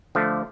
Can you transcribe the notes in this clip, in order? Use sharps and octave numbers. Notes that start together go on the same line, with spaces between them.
D3 F3 A3